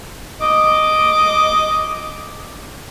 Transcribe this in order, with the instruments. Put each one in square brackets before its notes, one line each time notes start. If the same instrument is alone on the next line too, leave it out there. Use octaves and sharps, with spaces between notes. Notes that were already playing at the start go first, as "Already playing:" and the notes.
[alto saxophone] D#5 [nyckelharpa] D6